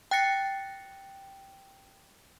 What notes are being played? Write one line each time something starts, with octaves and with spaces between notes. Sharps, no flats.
G5 F#6 A6 A#6 C#7